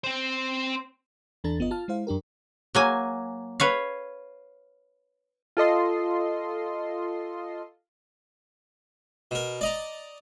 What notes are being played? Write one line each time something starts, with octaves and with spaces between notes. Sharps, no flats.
C4 C5
E2 E3 D4 A4 A#5 A6
G1 B3 F4 D#5
F4 A5 F6
G#3 E4 C5 F5
F#2 D4 G4 A#4
F#3 A#3 G#5
B4 C#5 F5
F4 A4 D#5 C6
B2 A#4
D5 D#5 A#5